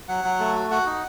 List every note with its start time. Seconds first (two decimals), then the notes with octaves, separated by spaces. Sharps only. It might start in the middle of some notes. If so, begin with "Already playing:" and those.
0.09 F#3 F#5
0.24 F#3
0.40 A3
0.56 F#4
0.71 F#4 F#5
0.86 D#4